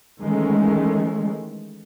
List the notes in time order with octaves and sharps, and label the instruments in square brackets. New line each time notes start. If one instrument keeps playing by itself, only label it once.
[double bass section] D#3 E3 G#3 A3 C#4